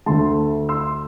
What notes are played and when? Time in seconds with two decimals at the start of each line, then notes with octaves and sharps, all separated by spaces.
0.06 D2 D3 A3 A5 C6
0.69 C6 E6